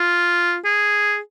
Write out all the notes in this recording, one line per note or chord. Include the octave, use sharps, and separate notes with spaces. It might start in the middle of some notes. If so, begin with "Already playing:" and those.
Already playing: F4
G#4